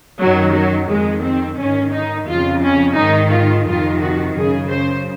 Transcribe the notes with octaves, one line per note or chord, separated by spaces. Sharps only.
F#2 D#3 F#3
F#3
F2 D#3 G#3
C4
G#2 D#3 C#4
D#4
F2 C#3 F4
C#4
G#2 D#3 D#4
F4
F2 C3 D#3 F4
F#4
F#2 C#3 G#4
C5